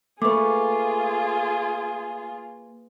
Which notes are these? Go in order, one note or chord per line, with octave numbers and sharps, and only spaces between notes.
A3 A#3 F4 G#4 B4 C#6 D6